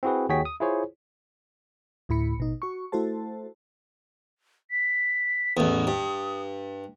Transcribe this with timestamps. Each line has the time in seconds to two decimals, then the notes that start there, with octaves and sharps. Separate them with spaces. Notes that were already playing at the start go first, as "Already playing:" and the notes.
0.03 C4 E4 F#4 G#4 B4
0.29 D#2 F#4 G#4 C#5 G5 B6
0.45 D#6
0.60 E4 F4 G#4 C5 C#5
2.09 D2 A2 E4 B5 C#7
2.38 A1 B2 D#4
2.62 F#4 C#6
2.92 A3 E4 F#4 A4 C5 A5
4.71 B6
5.57 A1 E2 D#6
5.87 G2